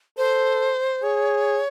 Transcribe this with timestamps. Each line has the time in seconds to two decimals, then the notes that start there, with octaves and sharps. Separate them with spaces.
0.18 A4 C5
1.02 G#4 C#5